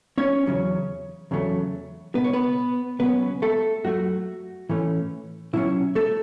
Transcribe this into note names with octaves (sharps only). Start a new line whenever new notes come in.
C#4 C#5
E2 C#3 F#3 C#4
E2 C#3 F#3 A3
C#2 B2 B3 B4
C#5
B3 B4
C#2 B2 F#3 B3 C#4 B4
A3 A4
F#2 F#3 A3 F#4
A2 E3 A3 C#4
B2 F#3 C#4 E4
A3 A4